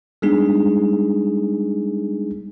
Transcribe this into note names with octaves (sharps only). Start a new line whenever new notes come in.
G3 G#3 B3 D4 D#4 G#4